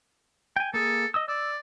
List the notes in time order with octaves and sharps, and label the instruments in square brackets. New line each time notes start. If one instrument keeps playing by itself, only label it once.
[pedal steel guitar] G5 G#5
[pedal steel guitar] A#3 G#4 [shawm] A4
[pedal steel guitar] D#5 D#6 E6
[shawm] D5 [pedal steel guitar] E6